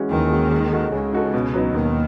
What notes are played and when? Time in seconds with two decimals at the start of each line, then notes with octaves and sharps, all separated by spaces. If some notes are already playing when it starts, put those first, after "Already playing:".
Already playing: E3 G#3 C#4 F#4
0.11 D#2 D#3 E3
0.31 G#3 C#4 F#4
0.51 G#3
0.72 D#4 F#4 A4
0.92 C#2 C#3 G#3
1.13 D#4 F#4 A4
1.34 B2
1.54 F#3 B3 D#4
1.74 D#2 B2 D#3